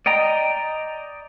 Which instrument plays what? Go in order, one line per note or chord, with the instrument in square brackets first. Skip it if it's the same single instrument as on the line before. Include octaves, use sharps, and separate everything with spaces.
[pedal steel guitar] D5 D#5 G5 A#5